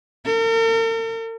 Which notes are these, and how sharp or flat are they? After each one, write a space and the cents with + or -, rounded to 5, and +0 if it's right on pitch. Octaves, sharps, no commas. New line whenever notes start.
A#4 -45